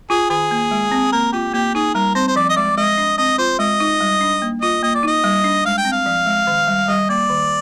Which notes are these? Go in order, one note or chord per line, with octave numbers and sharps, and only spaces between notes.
F4 G#4
D#3 G#4
A#3
G#3
C4
A#3 A#4
F4 G4
A#3 G4
D#4 G#4
G3 A#4
C4 C5
C5
F3 D5
D#5
G#3 D5
G#3 D#5
D4
C4 D#5
F4 C5
G#3 D#5
D#4
G3
D4
A#3
F4 D#5
A#3 D#5
D5
D#4 D#5
G3
D4
G#3 F5
G5
C4
F5
F3
G#3
D#3
G3
G3 D#5
A#3 D5
D#3